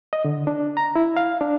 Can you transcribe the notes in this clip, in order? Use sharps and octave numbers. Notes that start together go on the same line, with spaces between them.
D#5
D3
D4
A#5
E4
F5
D4